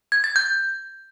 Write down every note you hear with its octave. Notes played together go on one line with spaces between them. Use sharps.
G#6
A6
G6